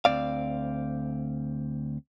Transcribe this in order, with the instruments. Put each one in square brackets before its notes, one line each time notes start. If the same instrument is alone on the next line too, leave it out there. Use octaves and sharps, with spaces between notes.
[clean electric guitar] D2 G2 C4 D5 F5